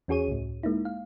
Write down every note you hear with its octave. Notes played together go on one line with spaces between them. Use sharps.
E2 C#4 F#4 G#4 C#5 D#7
C#2 A2
G#3 A#3 D#4 E4
F5